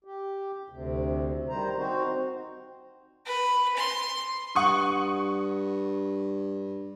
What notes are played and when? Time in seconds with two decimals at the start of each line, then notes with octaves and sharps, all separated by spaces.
0.04 G4
0.70 D2 C3
1.49 D#3 G3 C5 A#5
1.76 C4 D#4 F#4 C5
3.25 B4
3.77 C6
4.55 G2 F#5 C#6 D#6